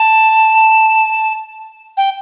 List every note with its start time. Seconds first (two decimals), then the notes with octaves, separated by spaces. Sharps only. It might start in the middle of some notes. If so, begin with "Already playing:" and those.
Already playing: A5
1.97 G5